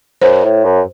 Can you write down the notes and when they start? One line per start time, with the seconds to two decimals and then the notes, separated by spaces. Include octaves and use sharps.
0.22 F#2 C5
0.44 A2
0.64 F#2